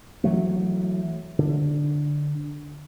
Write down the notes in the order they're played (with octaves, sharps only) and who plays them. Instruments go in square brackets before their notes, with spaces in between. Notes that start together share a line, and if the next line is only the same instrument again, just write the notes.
[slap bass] E3 F#3 A3
D3